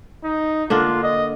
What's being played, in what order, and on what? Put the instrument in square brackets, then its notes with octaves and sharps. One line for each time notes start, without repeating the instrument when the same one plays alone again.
[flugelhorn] D#4
[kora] D3 A#3 D4 [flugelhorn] F4
[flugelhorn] D#5